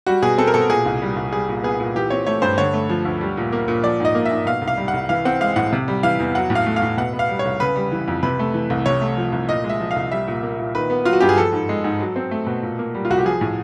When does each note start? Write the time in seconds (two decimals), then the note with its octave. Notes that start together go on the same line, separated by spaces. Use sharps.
0.07 G3 F#4
0.22 B2 G#4
0.38 C4 A4
0.47 A#4
0.54 B2 A4
0.69 A#2 G#4
0.86 C2
1.02 G3
1.16 C2
1.32 G3 G#4
1.49 A#2
1.63 B3 G#4
1.80 A#2
1.95 E3 G4
2.10 C4 C#5
2.26 A3 C#5
2.42 G2 C5
2.58 D3 C#5
2.73 A3
2.89 F3
3.05 D2
3.21 G3
3.37 A#2
3.52 A#3
3.68 A#2
3.84 F3 D5
4.00 G#2 D#5
4.15 A#3
4.25 E5
4.31 G#2
4.46 B2 F5
4.62 C2
4.68 F5
4.77 G3
4.88 F#5
4.94 C2
5.09 E3 F5
5.25 C4 F#5
5.40 G#3 F5
5.56 A2 F#5
5.72 C3
5.88 G3
6.03 E3 F5
6.20 E2
6.35 F#3 F#5
6.50 A2
6.55 F5
6.66 A3
6.76 F5
6.82 A2
6.97 B2 F#5
7.13 B3
7.19 F5
7.29 G3
7.39 C#5
7.45 C2
7.60 C#3 B4
7.76 G3
7.92 E3
8.08 F2
8.23 C3 B4
8.39 A3
8.54 E3
8.70 C2
8.86 C3 C#5
9.01 A3
9.17 F3
9.32 C2
9.49 A#2 D#5
9.64 G#3
9.69 E5
9.80 F3
9.91 F5
9.96 C2
10.11 G3 E5
10.28 A#2
10.43 A#3
10.59 A#2
10.75 D#3 B4
10.90 B3
11.05 F#3 F4
11.13 F#4
11.20 G2 G4
11.29 G#4
11.37 F3 A4
11.53 G#2
11.69 G#3
11.84 G#2
12.00 F#3
12.16 C4
12.31 A3
12.46 B2
12.63 A#2
12.79 A#3
12.95 G3
13.05 F4
13.10 C2 F#4
13.18 G4
13.25 F3 G#4
13.41 A2